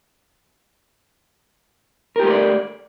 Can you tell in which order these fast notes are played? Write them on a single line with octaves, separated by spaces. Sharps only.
A#4 G4 A3 C5 D5